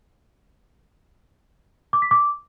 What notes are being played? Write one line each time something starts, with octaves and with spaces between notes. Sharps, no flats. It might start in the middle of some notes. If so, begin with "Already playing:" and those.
D6
B6
D6